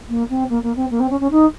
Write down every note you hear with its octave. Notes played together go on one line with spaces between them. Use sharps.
A#3
C4
A#3
A#3
C4
A#3
C4
C#4
C#4
D#4